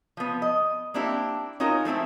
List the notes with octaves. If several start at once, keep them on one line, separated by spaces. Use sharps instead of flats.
F3 B3
D#5
A#3 C4 D4 E4 G4
C#4 D#4 F4 F#4 A#4
F3 A3 C4 E4